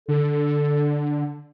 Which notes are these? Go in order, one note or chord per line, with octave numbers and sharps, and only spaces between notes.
D3 A4